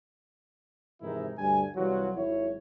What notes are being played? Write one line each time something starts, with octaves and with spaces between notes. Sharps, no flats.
G#2 C3 D#3 E3 D#4 E4
D2 G2 G#5
C2 E3 F#3 G3 F4 F#4
G#1 F#3 E4 C#5